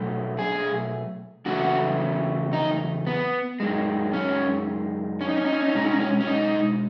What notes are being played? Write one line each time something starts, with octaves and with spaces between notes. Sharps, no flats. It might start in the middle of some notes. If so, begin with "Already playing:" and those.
Already playing: B2 F#3 A3
G#4
E2 C#3 F#3 A3 F#4
D#4
B3
F#2 D#3 G#3
C#4
C#4
D#4
C#4
D#4
C#4
D#4
C#4
B2 G#3 D#4
C#4
D#4
C#4
C#4
D#4